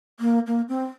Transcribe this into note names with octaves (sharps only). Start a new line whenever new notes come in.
A#3
A#3
C4